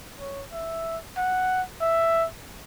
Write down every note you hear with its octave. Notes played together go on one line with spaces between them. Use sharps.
C#5
E5
F#5
E5